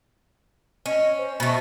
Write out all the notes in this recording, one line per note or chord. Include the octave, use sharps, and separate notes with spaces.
C#4 D#5
C5
B2 A3